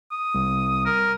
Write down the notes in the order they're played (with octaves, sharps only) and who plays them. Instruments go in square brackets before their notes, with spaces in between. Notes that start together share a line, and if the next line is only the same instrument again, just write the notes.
[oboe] D#6
[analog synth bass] C2
[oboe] A#4